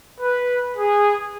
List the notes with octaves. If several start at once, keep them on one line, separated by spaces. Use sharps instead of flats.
B4
G#4